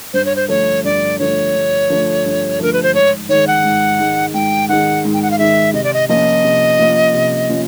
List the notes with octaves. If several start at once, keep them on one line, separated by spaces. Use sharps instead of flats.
G2 C5
C#5
C5
D3 F3 A3 C#5
G2 D5
D3 F3 A3 C#5
G2
D3 F3 A3
G2
D3 F3 A3 A#4
B4
C5
G#2 C#5
D#3 G#3 C#5
F#5
G#2
D#3 G#3
G#2 G5
D#3 G#3 F#5
G#2
G5
F#5
F5
D#3 G#3 E5
C3 D#5
D5
D#5
F3 A#3 C#4 F4 D#5
C3
F3 A#3 C#4 F4
C3
F3 A#3 C#4 F4